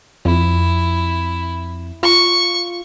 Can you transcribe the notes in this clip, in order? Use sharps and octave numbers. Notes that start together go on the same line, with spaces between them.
F2 E4
F4 C#6